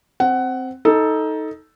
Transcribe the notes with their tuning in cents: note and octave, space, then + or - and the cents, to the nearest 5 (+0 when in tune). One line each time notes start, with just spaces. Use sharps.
C4 +0 F#5 +15
D#4 +15 A4 +0